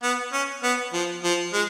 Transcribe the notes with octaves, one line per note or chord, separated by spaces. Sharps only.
B3
C#4
B3
F3
F3
G#3